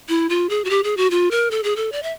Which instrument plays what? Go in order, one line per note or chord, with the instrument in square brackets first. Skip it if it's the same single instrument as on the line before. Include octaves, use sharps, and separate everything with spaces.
[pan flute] E4
F4
G#4
F#4
G4
G#4
F#4
F4
A#4
A4
G#4
A4
D5
E5